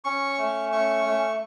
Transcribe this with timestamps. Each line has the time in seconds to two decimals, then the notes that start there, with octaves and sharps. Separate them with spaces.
0.04 C#4 C#6
0.38 A3
0.72 C#4 C#6
1.06 A3